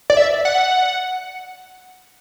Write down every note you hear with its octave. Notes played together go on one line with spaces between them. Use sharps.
D5
E5
F#5